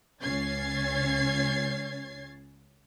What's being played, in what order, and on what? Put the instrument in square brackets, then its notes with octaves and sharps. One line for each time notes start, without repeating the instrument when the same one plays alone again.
[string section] C#2 C#4 C#5 G#6 A6 C7